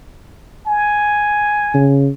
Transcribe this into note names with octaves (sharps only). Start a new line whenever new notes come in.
G#5
C#3